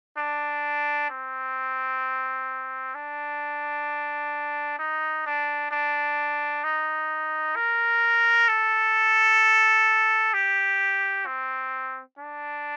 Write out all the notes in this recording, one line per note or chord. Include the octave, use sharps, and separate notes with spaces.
D4
C4
D4
D#4
D4
D4
D#4
A#4
A4
G4
C4
D4